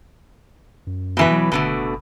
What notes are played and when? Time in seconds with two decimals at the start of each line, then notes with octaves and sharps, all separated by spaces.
0.87 F#2
1.17 B2 E3 B4
1.31 F#3
1.52 F#1 B2 D3 A3